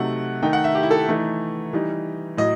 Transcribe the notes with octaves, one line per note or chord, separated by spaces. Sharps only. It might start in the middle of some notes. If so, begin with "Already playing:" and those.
Already playing: C3 F#3 A3 D#4 F#5
D#3 A3 D#4 G5
F#5
E5
G4
E4
A4
E3 A3 D#4
E3 G3 D#4
A2 F#3 D#5